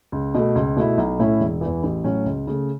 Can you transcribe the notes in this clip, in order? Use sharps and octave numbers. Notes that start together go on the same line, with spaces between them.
C#2
B2 A3
C#2
B2 A3 E4
B1
A2 A3 C#4 E4
E1
E2 E3
A1
A2 F#3 C#4 F#4
C#2
C#3 A3